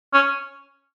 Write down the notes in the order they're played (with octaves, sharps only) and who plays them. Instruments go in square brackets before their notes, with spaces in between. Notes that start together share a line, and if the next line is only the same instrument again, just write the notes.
[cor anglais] C#4